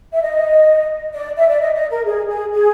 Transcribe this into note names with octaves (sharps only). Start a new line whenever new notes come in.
E5
D#5
D5
E5
D5
D#5
D#5
A#4
G#4
G#4
G#4